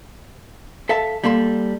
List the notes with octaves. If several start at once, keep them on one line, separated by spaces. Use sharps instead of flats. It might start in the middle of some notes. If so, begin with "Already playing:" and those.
A4 E5 F5 A5
G3 A#3 A4 C6